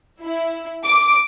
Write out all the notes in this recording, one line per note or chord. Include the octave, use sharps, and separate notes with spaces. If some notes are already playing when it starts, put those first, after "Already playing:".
E4
D6